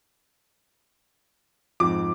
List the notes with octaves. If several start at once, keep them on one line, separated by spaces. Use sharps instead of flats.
F2 G#2 D6